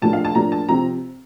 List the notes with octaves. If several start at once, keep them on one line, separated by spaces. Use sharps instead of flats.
A2 F3 A#3 D4 A5
F5
A5
A2 F3 A#3 D4 A#5
A5
C3 F3 C4 A#5